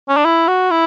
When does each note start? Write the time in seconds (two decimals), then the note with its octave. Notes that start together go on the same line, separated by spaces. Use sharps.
0.08 C#4
0.17 D4
0.25 E4
0.48 F#4
0.71 E4